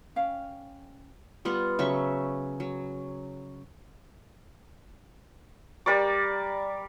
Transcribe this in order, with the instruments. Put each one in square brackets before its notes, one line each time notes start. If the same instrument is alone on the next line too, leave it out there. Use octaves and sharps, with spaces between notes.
[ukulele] C#4 F5 G5
[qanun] G3 B3 F4 F#5
C#3 F#3 E5 C#6
F#3
[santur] G3 A#4 D5 D6